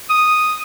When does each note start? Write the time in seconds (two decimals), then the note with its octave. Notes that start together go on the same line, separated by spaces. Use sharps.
0.10 D#6